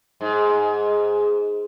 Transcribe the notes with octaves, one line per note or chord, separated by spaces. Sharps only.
G#2